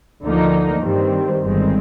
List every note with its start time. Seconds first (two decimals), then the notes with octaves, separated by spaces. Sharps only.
0.23 D2 D3 F3 A#3 D#4
0.82 G2 D#3 G3 C4
1.42 G1 G2 D#3 G#3 C4